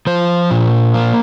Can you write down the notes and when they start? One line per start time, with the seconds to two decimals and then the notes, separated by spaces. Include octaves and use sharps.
0.07 F3 C5
0.51 A#2
0.94 A#3